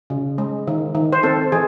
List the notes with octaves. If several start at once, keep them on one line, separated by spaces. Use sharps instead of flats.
C#3
G#3
D#3
D#3
C5
C4 A4
E3 G#4